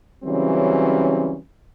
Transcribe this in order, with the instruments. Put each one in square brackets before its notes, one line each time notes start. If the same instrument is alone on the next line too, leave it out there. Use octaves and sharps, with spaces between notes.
[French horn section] C#3 E3 F#3 G3 C4 C#4